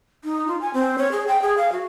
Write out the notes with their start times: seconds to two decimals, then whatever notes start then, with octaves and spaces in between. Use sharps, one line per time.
0.24 D#4
0.48 F4
0.61 G#5
0.74 C4
0.98 C#5
1.12 G#4
1.28 G5
1.42 G#4
1.58 F5
1.72 F#4